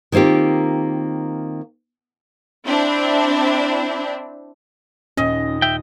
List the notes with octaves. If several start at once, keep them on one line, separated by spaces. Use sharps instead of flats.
D#3 A#3 C4 F4 G4
C4 D4 E4
D#2 A#2 C#4 D#5
E5 G5